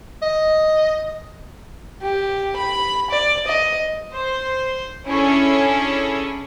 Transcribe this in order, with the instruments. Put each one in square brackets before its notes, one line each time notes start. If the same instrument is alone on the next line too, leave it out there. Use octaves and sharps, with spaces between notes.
[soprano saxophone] D#5
[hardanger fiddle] G4
B5
D5
D#5
[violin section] C5
C#4 D4 E4 G#4 A4 C#5